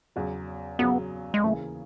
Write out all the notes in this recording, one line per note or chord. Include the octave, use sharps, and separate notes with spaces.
E2 C#3 F#3
E2 C#3 F#3 B3
G#3
D#2 C#3 E3 A3